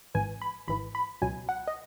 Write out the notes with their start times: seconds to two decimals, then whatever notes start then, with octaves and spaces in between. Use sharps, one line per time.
0.14 G#1 G#2 E3 G#5
0.42 B5
0.68 G#1 G#2 E3 B5
0.95 B5
1.22 C#2 B2 F#3 G#5
1.49 F#5
1.68 D#5